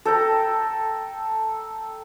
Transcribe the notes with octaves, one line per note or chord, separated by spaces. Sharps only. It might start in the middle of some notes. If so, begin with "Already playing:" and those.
A4 G5 A#5